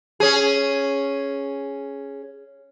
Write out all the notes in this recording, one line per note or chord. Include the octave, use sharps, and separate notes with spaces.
C#4 G#4